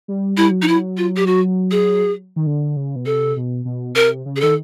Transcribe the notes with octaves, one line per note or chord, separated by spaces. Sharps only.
G3
G3 E4
F#3
F3 D#4
E4
F#3
F4
G4
F#4
G#4
D#3
D3
C#3
B2
C3 A4
B2
B2
C3 A#4
C#3
G#4
D#3 A4